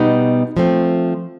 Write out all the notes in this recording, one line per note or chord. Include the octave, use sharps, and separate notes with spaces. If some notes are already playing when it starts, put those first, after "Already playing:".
Already playing: B2 G3 B3 D#4
F3 A3 C4